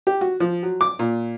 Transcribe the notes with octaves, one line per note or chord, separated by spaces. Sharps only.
G4
F#4
F3
F#3
D6
A#2